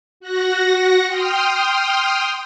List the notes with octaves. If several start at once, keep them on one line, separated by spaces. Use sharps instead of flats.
F#4 F#5 A#6
G5 C6 D#6 F6